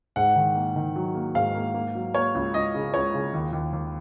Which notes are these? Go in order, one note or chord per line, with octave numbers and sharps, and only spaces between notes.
G#2 F#5
D#3
A#3
D#3
F#3
A#3
G#2 F5
A#3
A#3
F#3
A#3 C#5
C#2
C#2 D#5
C#3
C#2 C#5
C#3
D#2
D#2
D#2